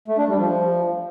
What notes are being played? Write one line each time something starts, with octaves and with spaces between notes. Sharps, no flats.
A3
D4
G3
F3